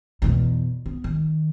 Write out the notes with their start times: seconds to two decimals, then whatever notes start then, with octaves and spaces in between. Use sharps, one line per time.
0.22 E2 B2
0.86 B3
1.04 D#3